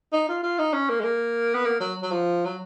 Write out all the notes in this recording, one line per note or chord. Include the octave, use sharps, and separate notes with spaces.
D#4
F4
F4
D#4
C#4
A#3
G#3
A#3
B3
A#3
F#3
F#3
F3
F#3